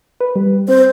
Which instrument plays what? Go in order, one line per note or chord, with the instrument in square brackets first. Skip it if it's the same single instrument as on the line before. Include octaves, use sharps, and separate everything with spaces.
[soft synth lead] B4
G3
[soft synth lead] C4 [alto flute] C5